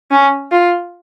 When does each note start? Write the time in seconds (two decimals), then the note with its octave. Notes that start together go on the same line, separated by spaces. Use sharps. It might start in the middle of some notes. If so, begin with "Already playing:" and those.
0.11 C#4
0.52 F4